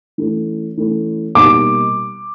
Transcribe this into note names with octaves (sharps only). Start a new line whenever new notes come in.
E3 A3 C#4
E3 A3 C#4
B2 G3 A#3 D#4 G4 D6